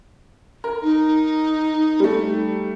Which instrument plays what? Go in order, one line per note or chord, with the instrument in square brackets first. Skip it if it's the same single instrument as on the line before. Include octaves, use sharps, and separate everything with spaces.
[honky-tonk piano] A#4
[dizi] D#4
[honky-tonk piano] G3 A3